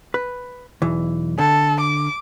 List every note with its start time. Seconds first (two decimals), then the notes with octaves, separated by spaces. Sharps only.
0.14 B4
0.82 B1 E2 E3
1.38 D3 A4
1.81 D6